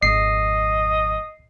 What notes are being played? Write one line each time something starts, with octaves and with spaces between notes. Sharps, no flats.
G#1 F2 D#5 C7